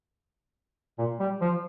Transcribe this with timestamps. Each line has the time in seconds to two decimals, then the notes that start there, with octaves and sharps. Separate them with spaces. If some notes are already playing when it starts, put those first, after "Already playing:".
0.99 A#2
1.20 G3
1.41 F3